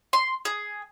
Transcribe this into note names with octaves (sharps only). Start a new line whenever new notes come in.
C6
G#4